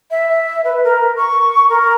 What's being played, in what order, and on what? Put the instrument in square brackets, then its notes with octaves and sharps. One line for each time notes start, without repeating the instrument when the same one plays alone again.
[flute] E5
B4
A#4
C#6
A#4